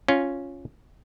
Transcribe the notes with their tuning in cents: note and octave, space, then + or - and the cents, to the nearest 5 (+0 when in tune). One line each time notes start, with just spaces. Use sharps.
C#4 +0 F4 +0